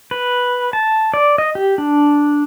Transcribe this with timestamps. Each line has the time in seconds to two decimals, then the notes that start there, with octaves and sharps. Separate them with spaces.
0.11 B4
0.73 A5
1.14 D5
1.38 D#5
1.55 G4
1.78 D4